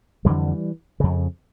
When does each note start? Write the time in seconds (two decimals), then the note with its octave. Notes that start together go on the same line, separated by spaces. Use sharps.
0.25 F2 D3 E3 G3
1.00 F2 C#3